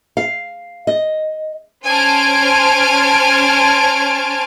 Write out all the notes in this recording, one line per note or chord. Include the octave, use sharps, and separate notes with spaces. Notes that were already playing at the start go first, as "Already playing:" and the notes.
F5
D#5
C#4 C5 G#5 A5 F6 D7